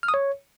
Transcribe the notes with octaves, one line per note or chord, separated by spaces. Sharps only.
F6
D#6
C#5